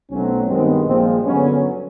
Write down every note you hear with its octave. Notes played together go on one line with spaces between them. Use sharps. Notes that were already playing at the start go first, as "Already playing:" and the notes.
B1 B2 F#3 A3 C4 C#4
G2 D#3 G#3 B3 C4
A#1 A#2 F3 G#3 C4
G2 D3 F#3 B3 C#4